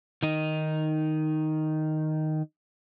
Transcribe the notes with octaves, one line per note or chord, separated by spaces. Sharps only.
D#3 D#4